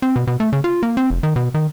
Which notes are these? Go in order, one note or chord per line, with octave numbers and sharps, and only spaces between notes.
C4
B2
B2
A3
C#3
F4
A#3
C4
F1
D#3
B2
D#3